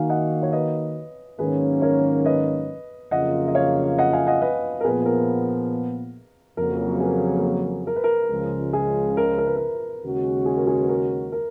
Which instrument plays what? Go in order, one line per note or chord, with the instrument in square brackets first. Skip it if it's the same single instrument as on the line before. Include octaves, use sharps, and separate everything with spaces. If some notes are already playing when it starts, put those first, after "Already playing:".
Already playing: [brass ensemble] D#3 A#3 D#4 F#4 [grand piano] F5 G#5
[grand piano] D#5 F#5
C#5
B4 D#5
[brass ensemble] G#2 D#3 F#3 A#3 C#4 [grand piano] G#4 B4
[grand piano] A#4 C#5
B4 D#5
[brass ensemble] F2 C#3 F#3 A#3 F4 [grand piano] D#5 F#5
[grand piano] D#5
C#5 F5
D#5 F#5
F5 G#5
D#5 F#5
B4 D#5
A#4
[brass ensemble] A#2 F3 B3 [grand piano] G#4 B4
[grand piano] B4
A#4
[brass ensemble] F2 C#3 F#3 A#3 [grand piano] A#4
[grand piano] G#4 B4
A#4
B4
A#4
[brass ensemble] C#2 C#3 F3 G#3
[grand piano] G#4
A#4
A#4
B4
A#4
[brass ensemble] D#2 C#3 G#3 C#4 F#4
[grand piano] G#4
A#4
G#4
B4
A#4
A#4